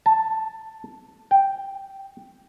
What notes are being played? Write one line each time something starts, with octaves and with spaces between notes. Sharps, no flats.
A5
G5